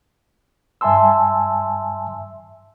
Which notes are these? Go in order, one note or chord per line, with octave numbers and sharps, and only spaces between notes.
G2 E5 G#5 A5 C6 E6